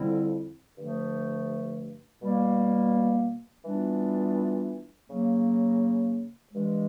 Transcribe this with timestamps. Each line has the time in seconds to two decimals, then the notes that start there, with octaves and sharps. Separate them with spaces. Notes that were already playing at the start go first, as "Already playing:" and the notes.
Already playing: F2 D3 G3 C4 E4
0.77 G2 D3 F3 A3
2.22 B2 G3 A#3
3.65 E3 G3 B3 D4 F4
5.09 C#3 F#3 A#3
6.53 G2 E3 G#3